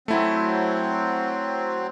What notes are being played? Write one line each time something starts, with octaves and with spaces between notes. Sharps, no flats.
F#3 A3 C4 E4